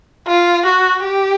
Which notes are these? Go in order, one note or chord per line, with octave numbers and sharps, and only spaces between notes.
F4
F#4
G4